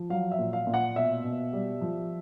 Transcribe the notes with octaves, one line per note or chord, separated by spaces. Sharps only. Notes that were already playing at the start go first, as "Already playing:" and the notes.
Already playing: F3
F#3 F5
E5
A#2
F5
A#2
F#5
B2 E5
B2
G3
F3